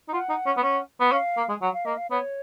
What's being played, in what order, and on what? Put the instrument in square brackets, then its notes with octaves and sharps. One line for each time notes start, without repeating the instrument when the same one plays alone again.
[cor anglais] D#4
[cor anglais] F4 [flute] F#5
[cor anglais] D#4
C#4
B3
C#4
B3
[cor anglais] C#4 [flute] F5
[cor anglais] A#3
G#3
[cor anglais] F#3 [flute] F#5
[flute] F5
[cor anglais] A#3 [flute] D#5
[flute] F5
[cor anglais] B3 [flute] C#5